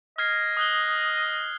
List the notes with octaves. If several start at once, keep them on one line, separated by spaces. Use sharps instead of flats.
D#5 F6 G#6 C7
D#6 F#6 G7